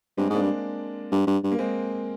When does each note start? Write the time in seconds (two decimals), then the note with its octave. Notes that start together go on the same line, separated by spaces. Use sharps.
0.18 G2 G#3 C4
0.30 G#2
0.33 A#3 D4
0.41 G2
1.12 G2
1.27 G2
1.44 G2
1.52 A#3
1.59 G#3 C4